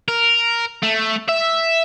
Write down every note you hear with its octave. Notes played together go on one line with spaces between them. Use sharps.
A#4
A3
E5